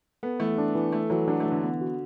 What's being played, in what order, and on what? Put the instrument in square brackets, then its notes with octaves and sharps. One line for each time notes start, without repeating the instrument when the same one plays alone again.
[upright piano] B3 [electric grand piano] A4
[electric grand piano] E3 [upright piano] A3
[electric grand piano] D4
E3
[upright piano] A3 [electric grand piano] A4
[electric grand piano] E3 [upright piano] F#3
[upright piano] F#3 [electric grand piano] D4
[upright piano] A3
[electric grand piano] E3
[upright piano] D3
[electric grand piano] B3
F#4